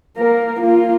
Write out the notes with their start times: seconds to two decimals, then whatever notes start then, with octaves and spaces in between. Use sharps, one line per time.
0.17 A#3 A#4
0.60 A#3 F4